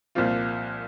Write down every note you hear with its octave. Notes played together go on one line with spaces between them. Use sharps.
C2 A#2 F3 C4 F4